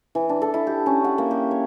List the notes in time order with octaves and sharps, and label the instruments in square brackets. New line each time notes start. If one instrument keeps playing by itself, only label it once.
[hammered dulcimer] E3
D4
A4
E4
G4
C#4
F#5
A#3
G4
C#5